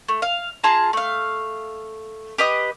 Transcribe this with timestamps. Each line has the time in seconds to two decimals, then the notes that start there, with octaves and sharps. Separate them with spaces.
0.08 A3
0.22 F5
0.63 F4 G#4 A5 A#5
0.93 A3 F5
2.38 G4 B4 D#5 D#6